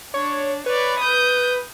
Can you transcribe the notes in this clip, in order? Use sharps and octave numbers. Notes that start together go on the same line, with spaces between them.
D4 C#5
B4 C#5 D5
D#6 G6